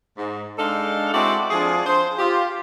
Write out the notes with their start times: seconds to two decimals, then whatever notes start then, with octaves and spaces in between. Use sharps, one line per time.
0.18 G#2
0.59 G#3 D4 D#4 A4 F5
1.14 G#3 C4 E4 F#4 D5
1.50 F3 D4 G#4
1.86 C5
2.19 F4 G4